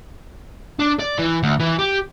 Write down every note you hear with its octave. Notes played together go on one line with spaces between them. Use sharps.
D4
D5
E3
D2
E3
G4